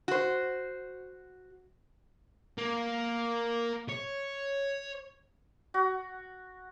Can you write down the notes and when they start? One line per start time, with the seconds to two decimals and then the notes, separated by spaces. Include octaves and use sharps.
0.08 F#4 C5
2.58 A#3
3.89 C#5
5.74 F#4